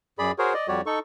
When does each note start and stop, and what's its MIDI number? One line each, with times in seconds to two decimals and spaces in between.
0.19 0.32 42
0.19 0.32 68
0.19 0.32 74
0.19 0.32 83
0.39 0.53 66
0.39 0.53 68
0.39 0.53 70
0.39 0.53 72
0.39 0.53 73
0.54 0.68 74
0.54 0.68 75
0.68 0.81 41
0.68 0.81 55
0.68 0.81 66
0.68 0.81 67
0.68 0.81 73
0.68 0.81 74
0.86 0.99 63
0.86 0.99 69
0.86 0.99 85